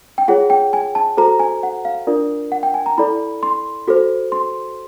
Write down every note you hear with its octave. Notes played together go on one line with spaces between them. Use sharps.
G5
F4 G#4 C#5 F#5
G5
G#5
A5
F#4 A4 C5 A#5
G#5
F#5
F5
D4 F4 A#4 D5
F#5
G5
G#5
A#5
E4 A4 D5 B5
C6
F#4 A4 C5
C6